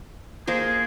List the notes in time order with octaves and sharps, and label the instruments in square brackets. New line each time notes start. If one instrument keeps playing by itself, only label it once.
[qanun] A#3 A#4 C5 [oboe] G#4